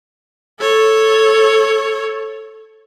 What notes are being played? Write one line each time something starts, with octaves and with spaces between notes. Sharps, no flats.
A4 C#5